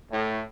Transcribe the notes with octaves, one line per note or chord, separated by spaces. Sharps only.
A2